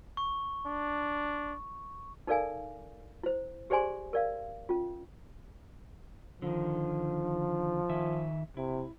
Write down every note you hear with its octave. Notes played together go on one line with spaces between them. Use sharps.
C#6
D4
D#4 A4 A#4 D5 F5 G#5
E4 C5
G4 G#4 C5 D5 G#5 C6
A#4 D5 F5
C#4 F4
D3 D#3 F3
D#3 E5 G#5
C3 E4